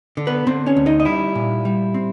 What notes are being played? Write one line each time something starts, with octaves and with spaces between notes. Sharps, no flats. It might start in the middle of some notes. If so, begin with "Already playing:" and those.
D3
B3 B4
D3 C4 C5
C#4 C#5
D2
D#4 D#5
D#5
G3 E4 E5
A#2
G3
C4